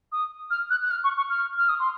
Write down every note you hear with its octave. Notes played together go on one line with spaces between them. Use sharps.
D#6
F6
F#6
F#6
F6
C#6
C#6
F6
F6
D#6
C6